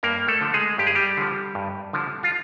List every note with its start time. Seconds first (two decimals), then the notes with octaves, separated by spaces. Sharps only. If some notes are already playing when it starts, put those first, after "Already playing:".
0.03 G2 A#3 A#4
0.28 A3 A4
0.41 D3 F3
0.54 G#3 G#4
0.78 G2 G4
0.87 G#4
0.95 G3 G4
1.17 D3 F3
1.55 G2
1.93 D3 F3
2.23 F4